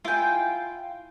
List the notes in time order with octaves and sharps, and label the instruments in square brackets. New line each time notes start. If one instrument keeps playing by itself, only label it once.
[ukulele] E4 G#5 [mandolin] F4 G5